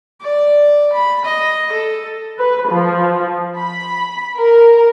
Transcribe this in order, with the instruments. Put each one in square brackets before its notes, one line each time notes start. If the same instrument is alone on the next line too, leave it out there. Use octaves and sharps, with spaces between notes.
[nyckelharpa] D5
B5
D#5
A4
[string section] B4
F3
B5
A#4